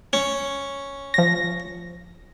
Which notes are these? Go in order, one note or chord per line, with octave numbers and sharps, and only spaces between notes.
C#4
F3 A#6